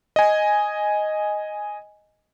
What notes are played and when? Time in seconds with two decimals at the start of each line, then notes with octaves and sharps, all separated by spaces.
0.16 D#5 G#5